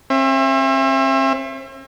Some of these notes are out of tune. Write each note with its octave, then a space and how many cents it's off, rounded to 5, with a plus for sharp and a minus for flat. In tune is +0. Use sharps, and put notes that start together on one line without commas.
C4 +45 E5 +20